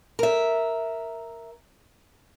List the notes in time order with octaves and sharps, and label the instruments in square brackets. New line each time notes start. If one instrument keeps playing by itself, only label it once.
[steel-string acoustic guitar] A#4 E5